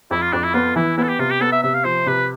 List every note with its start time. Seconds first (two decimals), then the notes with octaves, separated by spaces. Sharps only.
0.11 F2 E4
0.22 F4
0.33 F2 D4
0.44 E4
0.54 B3 F4
0.76 E3 E4
0.97 B3 E4
1.03 A4
1.08 G4
1.19 C3 F4
1.30 G4
1.41 B3 A4
1.52 E5
1.63 C3 E5
1.74 F5
1.84 F3 C5
2.06 C3 B4